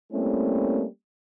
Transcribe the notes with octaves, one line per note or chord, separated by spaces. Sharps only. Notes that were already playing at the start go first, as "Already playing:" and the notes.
G3 A3 A#3 C4 C#4 E4